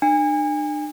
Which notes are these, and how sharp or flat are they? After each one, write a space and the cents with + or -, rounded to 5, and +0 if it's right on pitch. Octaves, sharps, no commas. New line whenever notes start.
D4 +40 G#5 -30